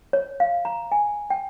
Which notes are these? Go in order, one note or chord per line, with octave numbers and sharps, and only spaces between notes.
C#5
F5
A#5
G#5
G5